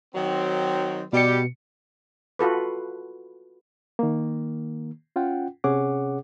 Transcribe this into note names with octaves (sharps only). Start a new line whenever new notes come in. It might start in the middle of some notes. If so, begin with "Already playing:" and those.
D#3 F#3 C4
B2 G3 G4 C#7
F4 F#4 A4 B4
D#3 A#3
C#4 F4 F#5 G5
C3 C#4 G#4 C#5 F#5 D6